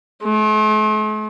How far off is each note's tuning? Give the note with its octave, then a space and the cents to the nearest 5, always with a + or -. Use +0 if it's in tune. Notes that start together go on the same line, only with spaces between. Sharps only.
A3 -45